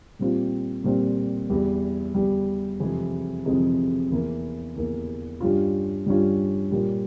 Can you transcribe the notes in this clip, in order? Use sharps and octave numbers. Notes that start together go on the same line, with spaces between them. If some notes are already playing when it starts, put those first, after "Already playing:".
A#2 G3 C4 F4
A#2 G3 C4 F4
E2 E3 G3
E2 E3 G3
F2 C3 E3 G#3 E4
F2 C3 E3 G#3 E4
E2 E3 A#3 E4
E2 E3 A#3 E4
G2 G3 C#4 F4
G2 G3 C#4 F4
A#2 G3 A#3 C#4 F4